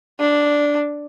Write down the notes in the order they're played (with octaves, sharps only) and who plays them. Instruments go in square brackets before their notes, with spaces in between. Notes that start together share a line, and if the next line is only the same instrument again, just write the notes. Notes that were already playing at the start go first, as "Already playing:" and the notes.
[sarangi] D4